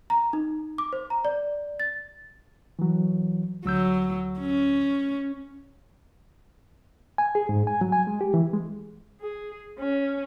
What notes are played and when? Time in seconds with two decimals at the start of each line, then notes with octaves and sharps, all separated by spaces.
0.10 A#5
0.33 D#4
0.78 D6
0.93 C5
1.10 A#5
1.25 D5
1.80 A6
2.79 E3 F#3
3.65 D2 F#3 E6 G6
4.40 C#4
7.18 G#5
7.35 G#4
7.49 G#2
7.67 G#5
7.81 F#3
7.92 G#5
8.07 G#3
8.21 G4
8.34 E3
8.53 G#3
9.20 G#4
9.79 C#4